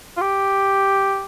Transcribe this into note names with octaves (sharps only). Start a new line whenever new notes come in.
F4
G4